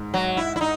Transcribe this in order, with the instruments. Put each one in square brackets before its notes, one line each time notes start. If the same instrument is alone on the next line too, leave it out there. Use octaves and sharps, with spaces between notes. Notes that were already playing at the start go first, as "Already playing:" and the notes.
Already playing: [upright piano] G#2
[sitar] F#3
E4
E4
D#4